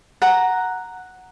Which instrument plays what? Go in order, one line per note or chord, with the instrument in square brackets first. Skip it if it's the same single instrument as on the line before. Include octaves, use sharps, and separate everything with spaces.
[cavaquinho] F#5 A#5